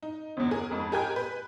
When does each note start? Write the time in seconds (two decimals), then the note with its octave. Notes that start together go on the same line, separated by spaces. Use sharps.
0.03 D#4
0.37 G1 E2
0.51 G#4 A#4
0.71 F2 G#2
0.92 G4 G#4 A#4 G5 G#5 G6
1.16 B4